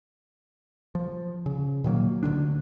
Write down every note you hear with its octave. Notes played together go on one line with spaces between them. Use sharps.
F3
C#3
A#2 D#3 F#3 A#3
D2 D3 D#3 D4